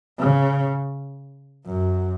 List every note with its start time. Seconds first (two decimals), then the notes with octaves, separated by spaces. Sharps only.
0.19 C#3
1.66 F#2